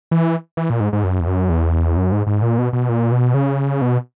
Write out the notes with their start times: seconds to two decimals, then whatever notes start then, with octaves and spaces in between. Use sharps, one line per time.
0.11 E3
0.57 E3
0.70 A#2
0.80 G#2
0.93 G#2
1.04 F#2
1.20 E2
1.27 F#2
1.50 E2
1.97 F#2
2.12 G#2
2.27 G#2
2.42 A#2
2.58 B2
2.73 B2
2.89 A#2
3.12 B2
3.34 C#3
3.82 B2